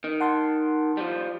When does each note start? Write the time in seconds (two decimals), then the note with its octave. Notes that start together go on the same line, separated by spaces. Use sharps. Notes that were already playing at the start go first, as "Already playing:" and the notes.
0.04 D#3
0.20 F#5 A5 C6
0.97 F3 G3